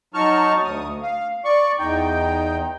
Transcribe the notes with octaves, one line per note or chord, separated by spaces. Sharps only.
F#3 D#4 A5 C#6 F6
D2 D#6
F5
D5 C#6
E2 D#4 G5